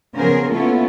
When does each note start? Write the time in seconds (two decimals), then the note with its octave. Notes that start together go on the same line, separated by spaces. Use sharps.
0.15 C#3 F3 B3 G#4 A#4 C5
0.52 A#3 B3 C#4 E4 F4 A4